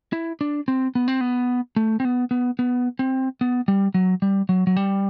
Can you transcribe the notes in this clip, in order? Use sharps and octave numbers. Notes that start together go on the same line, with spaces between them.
E4
D4
C4
B3
C4
B3
A3
C4
B3
B3
B3
C4
B3
G3
F#3
G3
F#3
F#3
G3